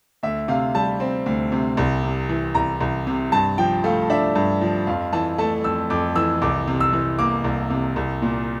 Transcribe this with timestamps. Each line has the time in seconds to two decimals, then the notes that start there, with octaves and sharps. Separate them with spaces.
0.23 D2 E5
0.48 C3 F5
0.75 G3 A5
1.00 C4
1.26 D2
1.52 C3
1.77 C2
2.03 C3
2.29 E3
2.55 C2 A#5
2.80 C2
3.07 C3
3.32 G2 A5
3.58 F3 G5
3.84 A3 F5
4.10 D4 E5
4.35 G2
4.61 F3
4.87 F2 F5
5.13 E3 A5
5.38 A3 A5
5.64 F2 E6
5.90 F2 D6
6.16 E3 E6
6.42 C2 D6
6.68 C3
6.80 E6
6.93 E3
7.19 A#3 D6
7.44 C2
7.70 C3
7.96 C2
8.22 A#2